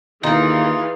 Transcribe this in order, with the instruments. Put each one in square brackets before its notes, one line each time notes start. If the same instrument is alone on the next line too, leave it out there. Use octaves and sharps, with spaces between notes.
[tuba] D#2 [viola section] E3 G#4 F5 [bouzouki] D#4 [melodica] F4